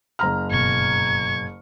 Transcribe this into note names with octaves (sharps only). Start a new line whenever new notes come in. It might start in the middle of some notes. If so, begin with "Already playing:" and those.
F#1 A#5 F6
G1 B2 C#6 G#6